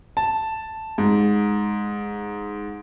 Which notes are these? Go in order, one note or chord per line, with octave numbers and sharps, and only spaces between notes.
A5
G#2